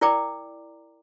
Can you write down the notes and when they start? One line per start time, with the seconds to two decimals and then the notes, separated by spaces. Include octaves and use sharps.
0.01 E4 A#4 D5 G5 A#5 D6